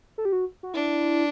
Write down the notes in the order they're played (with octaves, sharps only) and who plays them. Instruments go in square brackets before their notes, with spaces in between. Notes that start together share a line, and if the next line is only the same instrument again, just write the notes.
[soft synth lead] A4
G4
F#4
F#4
[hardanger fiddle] D4 [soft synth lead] E4